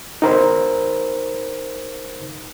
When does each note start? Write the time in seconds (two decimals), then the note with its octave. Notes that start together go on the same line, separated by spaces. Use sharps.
0.22 D#4 A#4 C5